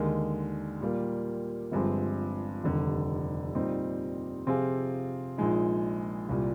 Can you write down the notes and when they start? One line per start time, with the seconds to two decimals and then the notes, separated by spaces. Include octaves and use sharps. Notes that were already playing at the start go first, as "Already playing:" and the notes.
Already playing: D#2 D3 G#3 D#4 A#4
0.80 A#2 G3 A#3
1.71 G1 G2 F3 G#3 C4
2.64 F1 D#2 D3 G3
3.55 A#2 G3 C4 D#4
4.47 C3 F3 C4 F4 G#4
5.38 A#1 A#2 G#3 D#4
6.29 C2 A#2 G3